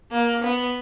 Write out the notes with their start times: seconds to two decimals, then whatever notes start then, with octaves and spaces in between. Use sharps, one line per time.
0.12 A#3
0.43 B3